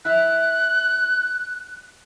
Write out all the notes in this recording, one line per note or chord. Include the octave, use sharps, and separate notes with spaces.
E4 E5 F#6